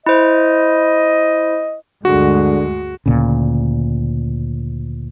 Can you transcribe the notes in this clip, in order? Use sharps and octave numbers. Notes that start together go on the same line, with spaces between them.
E4 C5 D#5
D2 G2 D3 G#3 F#4
D2 A#2 C#3